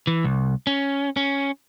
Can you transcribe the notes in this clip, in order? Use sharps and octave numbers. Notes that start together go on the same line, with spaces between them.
E3
C2
C#4
C#4